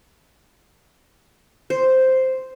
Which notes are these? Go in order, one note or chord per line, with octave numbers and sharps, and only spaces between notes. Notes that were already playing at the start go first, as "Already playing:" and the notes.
C5